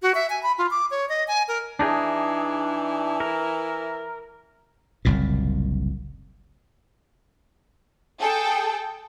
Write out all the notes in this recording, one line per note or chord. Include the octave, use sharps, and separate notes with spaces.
F#4
E5
G#5
B5
F4
D6
C#5
D#5
G#5
A#4
E3 D4 D#4 G#4
A#4
F#1 C2 A#2
G#4 A4 G5